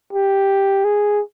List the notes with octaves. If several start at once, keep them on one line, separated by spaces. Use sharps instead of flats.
G4
G#4